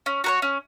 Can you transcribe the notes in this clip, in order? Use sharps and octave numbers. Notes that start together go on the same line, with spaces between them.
C#4
F#4 A#4 C#5
C#4